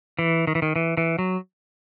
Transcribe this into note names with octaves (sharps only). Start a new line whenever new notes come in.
E3
D#3
E3
D#3
E3
E3
F#3